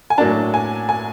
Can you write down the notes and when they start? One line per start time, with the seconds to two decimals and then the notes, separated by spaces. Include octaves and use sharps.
0.10 G#5
0.18 A2 F#3 A#3 D4 A5
0.54 G#5
0.89 G#5